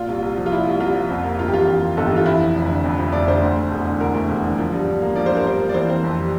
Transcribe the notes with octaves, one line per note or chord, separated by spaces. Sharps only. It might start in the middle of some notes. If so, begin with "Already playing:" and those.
Already playing: A#2 F4
C2
C2
F3
F4
A#2 E4
C2
C2 F4
F3
F2
A#3
G1 F4
G4
E3 F4
F2 F4
A#3
G1 A4
G4
E3 F4
F2 E4
F3
F1
D3
F2
F3
F1 D5
D3 C5
D2
A3
E1
D3
D2 A#4
A3
E1
D3
F3
G2
G2
A#3
F3 D5
G2 C5
A#4
G2 C5
A#3
D5
E3 C5
C4 C5
F2
G3